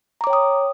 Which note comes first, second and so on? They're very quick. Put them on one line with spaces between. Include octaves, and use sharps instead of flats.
A#5 D6 C#5 G5 D#6